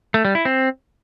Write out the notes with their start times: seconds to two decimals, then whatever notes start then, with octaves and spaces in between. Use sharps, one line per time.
0.14 A3
0.25 G3
0.35 E4
0.45 C4